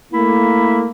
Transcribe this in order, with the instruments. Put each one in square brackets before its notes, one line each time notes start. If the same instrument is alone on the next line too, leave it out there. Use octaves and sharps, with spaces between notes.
[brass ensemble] A3 A#3 [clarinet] E4